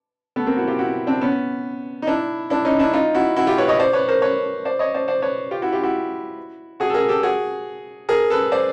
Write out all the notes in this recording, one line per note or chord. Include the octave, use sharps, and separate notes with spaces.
A3 B3
A#3 C4
E4 F#4
F4 G4
E4 F#4
C4 D4
B3 C#4
D#4
D4 E4
D4 E4
C#4 D#4
D4 E4
D#4 F4
E4 F#4
E4 F#4
F4 G4
B4 C#5
C#5 D#5
C5 D5
B4 C#5
A#4 C5
B4 C#5
C5 D5
C#5 D#5
C5 D5
C5 D5
B4 C#5
F4 G4
E4 F#4
F4 G4
E4 F#4
F#4 G#4
A4
G#4 A#4
G4 A4
F#4 G#4
G#4 A#4
A4 B4
C5 D5